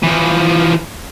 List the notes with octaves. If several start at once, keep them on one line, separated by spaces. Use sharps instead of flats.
E3 F3